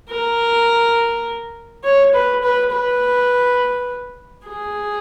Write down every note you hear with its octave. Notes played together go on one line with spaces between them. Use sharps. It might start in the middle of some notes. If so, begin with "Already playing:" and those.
A#4
C#5
B4
B4
B4
G#4